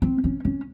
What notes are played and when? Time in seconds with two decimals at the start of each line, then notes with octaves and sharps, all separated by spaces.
0.02 C4
0.24 C#4
0.45 C#4